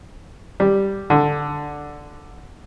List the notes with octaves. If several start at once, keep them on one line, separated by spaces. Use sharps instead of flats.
G3
D3